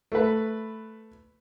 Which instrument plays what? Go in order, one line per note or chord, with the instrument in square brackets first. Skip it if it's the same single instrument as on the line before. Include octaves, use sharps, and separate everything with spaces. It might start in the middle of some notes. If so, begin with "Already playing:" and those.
[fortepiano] A3 B4